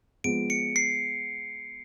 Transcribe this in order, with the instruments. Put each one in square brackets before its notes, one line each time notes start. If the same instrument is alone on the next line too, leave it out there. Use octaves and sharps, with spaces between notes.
[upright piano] F3 G#3 B3 [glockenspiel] D7
[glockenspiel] C#7
C7